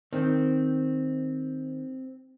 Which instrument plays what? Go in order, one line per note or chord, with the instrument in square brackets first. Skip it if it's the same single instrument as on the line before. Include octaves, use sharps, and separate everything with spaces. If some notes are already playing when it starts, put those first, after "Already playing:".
[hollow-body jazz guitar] D#3 [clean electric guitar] C4